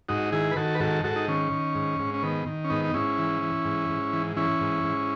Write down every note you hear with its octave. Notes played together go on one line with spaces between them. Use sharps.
G#2 D#4 F#4
D#3 E4 G#4
B4
D#3 F#4 A4
B4
G#2 F#4 A4
G#2 F#4 A4
D#4
D#3 C#4
D#3
G#2
G#2
C#4
D#3 B3
D#3
C#4
G#2 B3 D#4
D#4
G#2 C#4 E4
E3
E3
G#2
G#2
E3
E3 C#4 E4
G#2
G#2